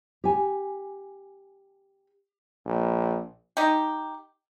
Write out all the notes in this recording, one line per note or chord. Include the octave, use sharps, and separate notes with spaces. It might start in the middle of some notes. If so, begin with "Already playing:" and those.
G4 G#5
A#1
D#4 G4